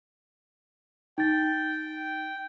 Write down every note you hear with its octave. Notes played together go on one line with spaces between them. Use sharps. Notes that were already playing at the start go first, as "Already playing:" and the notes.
D#4 G5 A6